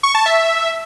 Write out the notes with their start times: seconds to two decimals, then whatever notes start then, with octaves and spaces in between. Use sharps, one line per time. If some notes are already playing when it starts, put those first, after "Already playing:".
0.03 C#6
0.15 A5
0.26 E5